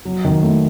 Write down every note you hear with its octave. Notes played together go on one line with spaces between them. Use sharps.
F#3
D#3
A3